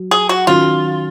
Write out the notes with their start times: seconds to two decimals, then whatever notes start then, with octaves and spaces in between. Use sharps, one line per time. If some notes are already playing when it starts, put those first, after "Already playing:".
Already playing: F#3
0.11 G#4
0.29 F#4
0.47 D#3 F#3 C#4 F4 F#4